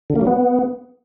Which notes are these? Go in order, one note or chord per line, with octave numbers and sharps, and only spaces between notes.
D3
A#3
F#3
B3